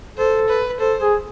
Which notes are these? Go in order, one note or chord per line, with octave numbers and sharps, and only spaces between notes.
A4 C5
B4
A4 C5
G#4